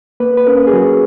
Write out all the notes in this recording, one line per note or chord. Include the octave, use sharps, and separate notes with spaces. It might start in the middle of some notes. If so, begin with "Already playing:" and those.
A#3 B4
B4
C#4 A#4
G#4
F#3 F#4